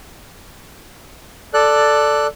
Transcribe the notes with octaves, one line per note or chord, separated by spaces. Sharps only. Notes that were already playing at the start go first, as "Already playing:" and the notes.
A4 D5 F#6